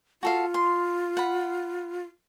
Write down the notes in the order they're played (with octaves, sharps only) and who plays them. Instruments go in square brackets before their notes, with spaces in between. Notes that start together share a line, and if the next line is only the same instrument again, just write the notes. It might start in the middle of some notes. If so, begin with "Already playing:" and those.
[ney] F4 [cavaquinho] F#4 A4 F5
[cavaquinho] C6
F#5 B5